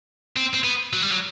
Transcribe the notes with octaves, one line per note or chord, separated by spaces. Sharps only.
C4
C4
B3
F#3
G3
F#3